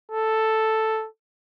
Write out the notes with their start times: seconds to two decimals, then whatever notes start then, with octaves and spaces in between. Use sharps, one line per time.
0.12 A4